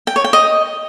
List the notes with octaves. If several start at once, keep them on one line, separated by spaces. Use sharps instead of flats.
G5
C#5
G5
D#5